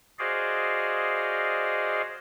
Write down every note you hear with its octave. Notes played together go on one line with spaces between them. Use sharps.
F#4 G#4 C5 D5 D#5 F5